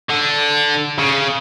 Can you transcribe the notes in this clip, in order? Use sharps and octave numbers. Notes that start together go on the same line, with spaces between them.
D3
C#3